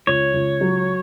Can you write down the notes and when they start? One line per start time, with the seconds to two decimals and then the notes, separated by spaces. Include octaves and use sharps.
0.07 C#2 C#5
0.34 C#2
0.61 F#3